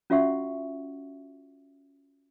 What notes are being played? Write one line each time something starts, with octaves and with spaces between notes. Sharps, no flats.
C#4 F4 F#4 E5 F#5 C#6